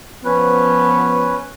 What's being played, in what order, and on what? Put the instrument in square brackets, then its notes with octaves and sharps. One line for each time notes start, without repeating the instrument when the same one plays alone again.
[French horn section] F3 B3 [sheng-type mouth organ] C#4 B4